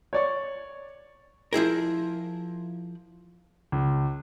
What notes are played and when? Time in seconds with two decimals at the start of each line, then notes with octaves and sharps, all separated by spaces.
0.13 C#5 D5 C#6
1.53 F3 E4 G#4 A#4
3.72 C#2